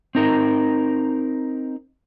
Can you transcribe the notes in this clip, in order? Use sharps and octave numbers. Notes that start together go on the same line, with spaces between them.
C4 D#4 A#4